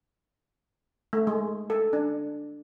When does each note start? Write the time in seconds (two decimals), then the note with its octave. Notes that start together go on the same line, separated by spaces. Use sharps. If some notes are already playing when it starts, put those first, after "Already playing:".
1.13 A3
1.27 G#3
1.70 A4
1.93 D4